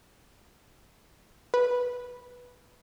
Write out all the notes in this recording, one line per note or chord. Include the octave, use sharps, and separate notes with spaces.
B4